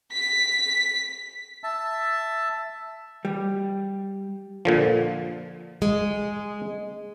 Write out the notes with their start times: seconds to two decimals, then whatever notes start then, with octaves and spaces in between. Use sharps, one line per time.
0.13 B6
1.64 E5 A5
3.25 G3
4.65 A#2 D3 F3
5.82 G#3